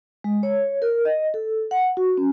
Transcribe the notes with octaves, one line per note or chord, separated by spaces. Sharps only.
G#3
C#5
A#4
D#5
A4
F#5
F#4
C#4